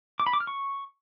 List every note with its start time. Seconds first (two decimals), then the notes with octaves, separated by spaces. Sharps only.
0.20 D6
0.27 B5
0.33 D6
0.40 F6
0.47 C#6